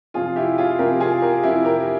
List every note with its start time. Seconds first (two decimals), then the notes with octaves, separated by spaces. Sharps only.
0.14 F2 C3 F3 F4 G#4
0.36 E4 G4
0.58 F4 G#4
0.79 F2 C3 F3 G4 A#4
1.00 F4 G#4
1.22 G4 A#4
1.43 F2 C3 F3 E4 G4
1.65 G4 A#4